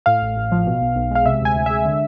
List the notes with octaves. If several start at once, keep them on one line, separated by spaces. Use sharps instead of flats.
A2 F5
A1
A1
F3
B2
B1
B1
G#3 F5
C3 E5
D2 G#5
D2
G#3 E5
D3